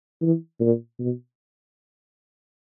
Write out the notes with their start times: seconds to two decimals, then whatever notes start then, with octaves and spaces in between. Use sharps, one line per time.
0.22 E3
0.60 A#2
0.99 B2